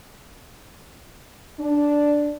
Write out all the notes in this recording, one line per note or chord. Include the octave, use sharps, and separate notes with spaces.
D4